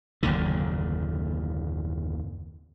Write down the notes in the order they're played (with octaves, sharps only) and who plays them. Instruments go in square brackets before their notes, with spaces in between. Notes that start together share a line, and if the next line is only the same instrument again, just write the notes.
[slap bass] F#1 D#2 A#2 D3